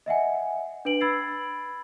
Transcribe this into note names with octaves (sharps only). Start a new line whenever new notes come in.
D#5 E5 F#5 G#5
D4 B4 D7 F#7
B5 E6 G#6 A6 C7